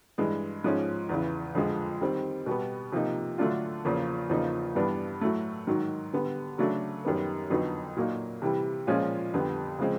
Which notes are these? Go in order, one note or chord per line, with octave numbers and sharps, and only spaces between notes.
G2 E3 G#3
G#2 F3 G#3 C#4
E2 C#3 E3
F2 D3 F3 G#3
D#3 G3 C4
B2 G3 B3
C3 F3 A#3 D#4
D3 F#3 A3 D4 F4
E2 C#3 F3 A#3 C#4
E2 C#3 F3 A#3 D#4
G2 E3 G3 B3 D4
A2 F#3 A3
G#2 D#3 F#3
D3 G3 B3
C#3 F#3 A3 D4
F#2 D#3 G3 B3
F2 D3 F#3 B3 D#4
A#2 F#3 A#3 D#4
C3 E3 G3
A#2 F3 G#3 C#4 F4
F2 D3 G3 B3
C#3 F3 G#3 C4